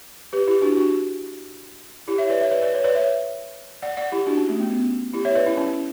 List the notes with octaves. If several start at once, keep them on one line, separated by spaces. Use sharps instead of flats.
G4 B4
E4 G4
D4 F#4
D4 F#4
E4 G4
C#5 E5
B4 D5
C#5 E5
B4 D5
B4 D5
C#5
B4 D5
C#5 E5
D5 F#5
D5 F#5
E4 G4
D4 F#4
C#4
A3
B3
C#4
E4 G4
C#5 E5
B4 D5
C#4 E4
C#4 E4